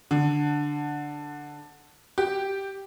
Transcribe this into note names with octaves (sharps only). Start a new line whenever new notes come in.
D3
G4